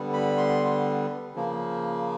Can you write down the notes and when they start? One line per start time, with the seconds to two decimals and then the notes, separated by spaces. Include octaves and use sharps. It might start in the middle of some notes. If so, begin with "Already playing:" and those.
Already playing: D3 G3 B3
0.13 B5
0.38 C6
1.35 C#3 F3 A#3